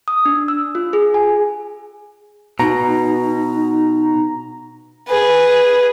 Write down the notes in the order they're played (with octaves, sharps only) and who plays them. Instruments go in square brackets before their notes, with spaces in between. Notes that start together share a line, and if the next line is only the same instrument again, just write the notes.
[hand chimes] D#6
D4
E6
F4
G#4
G#5
[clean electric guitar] B2 [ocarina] D#4 [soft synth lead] A#5
[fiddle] G#4 B4